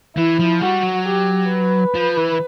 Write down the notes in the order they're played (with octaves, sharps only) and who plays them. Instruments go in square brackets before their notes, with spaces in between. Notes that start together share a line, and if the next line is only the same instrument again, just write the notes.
[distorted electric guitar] E3 [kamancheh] E4
[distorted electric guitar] F3
[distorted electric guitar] G3 [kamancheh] F#4
[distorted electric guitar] F#3
[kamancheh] G4
B4
[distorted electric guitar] F3
E3